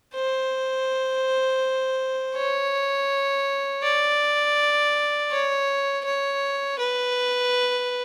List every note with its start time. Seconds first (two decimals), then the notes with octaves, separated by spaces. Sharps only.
0.14 C5
2.36 C#5
3.83 D5
5.31 C#5
6.05 C#5
6.79 B4